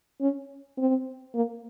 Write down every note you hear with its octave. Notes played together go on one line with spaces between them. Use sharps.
C#4
C4
A#3